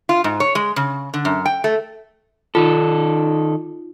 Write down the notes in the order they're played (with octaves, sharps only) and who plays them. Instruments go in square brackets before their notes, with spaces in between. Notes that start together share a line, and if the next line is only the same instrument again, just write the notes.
[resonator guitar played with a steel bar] F4
G#2
C#5
G#3
C#3
D3
F#2
G5
A3
[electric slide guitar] D#3 A4 [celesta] D#4 F4